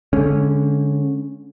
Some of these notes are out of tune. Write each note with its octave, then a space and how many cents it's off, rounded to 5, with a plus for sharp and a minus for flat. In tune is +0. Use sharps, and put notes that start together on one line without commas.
D3 -20 G#3 +5 C#4 -5